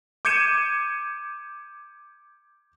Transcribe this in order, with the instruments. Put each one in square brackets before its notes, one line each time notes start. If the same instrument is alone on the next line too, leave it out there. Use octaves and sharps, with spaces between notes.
[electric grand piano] D6 G6 G#6 C#7 D#7 E7